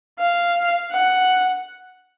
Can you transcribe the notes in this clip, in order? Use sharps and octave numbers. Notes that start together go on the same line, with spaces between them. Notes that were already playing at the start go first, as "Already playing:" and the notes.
F5
F#5